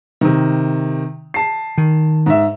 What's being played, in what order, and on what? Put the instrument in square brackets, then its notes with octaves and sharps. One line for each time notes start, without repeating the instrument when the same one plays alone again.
[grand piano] C3 D#3
A5 C7
[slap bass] D#3
[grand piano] G#2 E5